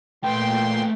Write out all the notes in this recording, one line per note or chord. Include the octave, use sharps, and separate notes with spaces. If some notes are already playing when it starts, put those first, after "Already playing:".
A#2 A3 B4 G5 C6